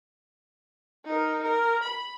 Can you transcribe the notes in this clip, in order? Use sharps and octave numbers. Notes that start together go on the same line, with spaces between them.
D#4 A#4
A#4
B5